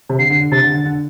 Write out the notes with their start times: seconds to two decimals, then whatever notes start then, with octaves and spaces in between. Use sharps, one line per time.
0.09 C3
0.18 D3 C7
0.30 D3
0.41 D3
0.52 C3 A6
0.63 D3
0.74 D3
0.85 D3